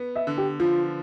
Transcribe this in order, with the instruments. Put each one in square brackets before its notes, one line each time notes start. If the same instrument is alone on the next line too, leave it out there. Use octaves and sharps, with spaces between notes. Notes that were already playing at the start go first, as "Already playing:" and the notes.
Already playing: [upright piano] B3
[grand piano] E5
[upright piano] D3
[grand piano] G4
[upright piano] F3 [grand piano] F4